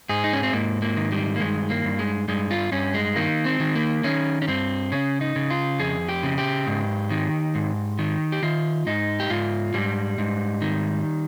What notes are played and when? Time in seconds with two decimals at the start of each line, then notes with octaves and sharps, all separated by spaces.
0.09 G#2 G#4
0.24 D#4
0.33 C#4
0.43 C4
0.53 G#2 A#3
0.82 A#3
0.97 D#3
1.12 G3
1.36 A#3
1.40 G2 G#3
1.70 A#3
1.85 G2
1.99 G#3
2.28 G2 G#3
2.51 F4
2.72 G2 C#4
2.94 G#3
3.16 D#3 A#3
3.45 C4
3.60 D#3
3.75 A#3
4.04 D#3 C#4
4.42 C#4
4.48 G2 C4
4.92 C#3 C#4
5.21 D#4
5.36 C#3
5.50 F4
5.79 F2 G#4
6.09 G4
6.23 C#3
6.38 G4
6.67 G#2
7.10 D#3
7.55 G#2
7.99 D#3
8.32 G4
8.43 D#3 F4
8.87 G#2 D#4
9.20 G4
9.30 G#2 F4
9.74 G#2 G3
10.18 G#2
10.62 D#3